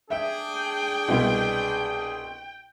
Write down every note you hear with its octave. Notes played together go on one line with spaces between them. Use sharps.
D4 G#4 E5 G5
C2 B2